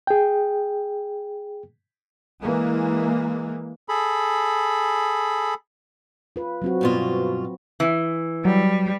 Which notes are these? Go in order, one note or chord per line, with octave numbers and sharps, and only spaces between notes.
G#4 G5
E3 G#3 A#3
G#4 A4 B5
F4 B4
F#3 C4 F#4
G2 B2 F4
E3
F#3 G3